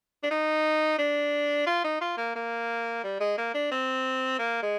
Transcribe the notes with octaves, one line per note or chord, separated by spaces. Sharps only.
D4
D#4
D4
F4
D#4
F4
A#3
A#3
G3
G#3
A#3
D4
C4
A#3
G#3